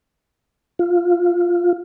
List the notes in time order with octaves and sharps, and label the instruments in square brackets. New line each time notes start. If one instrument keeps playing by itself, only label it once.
[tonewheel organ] F4